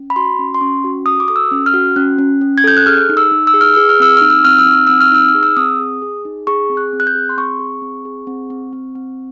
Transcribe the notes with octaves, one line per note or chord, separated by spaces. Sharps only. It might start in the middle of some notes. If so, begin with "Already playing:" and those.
Already playing: C#4
B5
F#4 C6
C#4
C6
C#4 C#6
F#4
F#4 D#6
D6
A4 D#6
E6
C#4
F6
F#4
C#4 F#6
C#4
C#4
G#6
A4 G6
F#6
G#4 F6
D#4
E6
D#4
E6
G#4
F6
G#4 E6
F6
C4 E6
D#4 F6
E6
C4 F6
E6
D#4
F6
C4 E6
F6
D#4 E6
F6
G#4
E6
C4 D#6
G#4
G#4
D#4
G#4 C#6
C4
F#6
C4
F#6
G6
G#4
C6
C4 C#6
G#4
C4
G#4
C4
C4
C4
C4